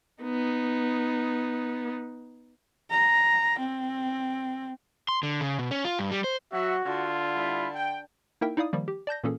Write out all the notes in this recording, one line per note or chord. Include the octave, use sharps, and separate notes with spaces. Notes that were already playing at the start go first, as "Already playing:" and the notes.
B3 D#4
A#5
C4
C6
D3
C#3
B2
C#4
F4
G2
G3
C5
F#3 F#4 E5
D3 F4
G3 E4 B5
G5
A#3 D#4 E4 A#4 E5 G5
D#4 E4 D5 F5 D#6
D#3 F3 G3 A#3
G4
D5 A5 G6 A#6
A#2 E3 A#3 C#4 G#4 A4